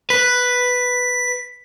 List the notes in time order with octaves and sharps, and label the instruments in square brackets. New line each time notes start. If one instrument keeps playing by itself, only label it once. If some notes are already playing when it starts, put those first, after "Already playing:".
[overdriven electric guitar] B4 [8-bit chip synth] B6